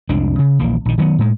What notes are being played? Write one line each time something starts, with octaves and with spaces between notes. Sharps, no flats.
C2 F2 G#3 D4
C#3
D#1 A#1 E3 A#3
A#1 D#3
D#3 F#3 A3 B3
A2 G#3